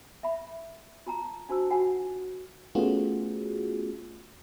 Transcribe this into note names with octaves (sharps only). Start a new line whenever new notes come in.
E5 B5
F4 A5 A#5
D4 F#4 C5 A5 E6
F4 F#4 F#5 G#5
A3 B3 C#4 F4 F#4 G#4